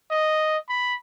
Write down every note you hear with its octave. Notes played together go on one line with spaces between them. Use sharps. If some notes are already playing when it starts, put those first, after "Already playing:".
D#5
B5